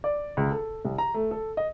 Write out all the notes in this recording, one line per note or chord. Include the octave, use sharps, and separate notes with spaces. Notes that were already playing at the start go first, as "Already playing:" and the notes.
D5
C#2
A4
C2
A#5
A3
A4
D#5